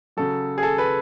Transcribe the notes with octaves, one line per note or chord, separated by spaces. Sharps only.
C#3 F#3 A4
G#4
A4
B4